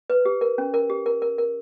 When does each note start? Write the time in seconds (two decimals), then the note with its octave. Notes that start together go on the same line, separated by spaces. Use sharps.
0.10 B4
0.25 G4
0.41 A#4
0.58 C#4
0.74 A#4
0.90 G4
1.06 A#4
1.22 A#4
1.38 A#4